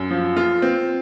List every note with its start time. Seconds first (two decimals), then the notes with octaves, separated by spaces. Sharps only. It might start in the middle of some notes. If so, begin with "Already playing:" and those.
Already playing: F#2
0.11 F3
0.37 F4
0.62 C4